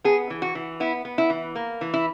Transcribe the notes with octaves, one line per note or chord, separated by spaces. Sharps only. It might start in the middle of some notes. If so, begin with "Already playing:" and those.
B3 G#4
E3
F#4
E3
B3 E4
B3
E4
E3
A#3
E3
E4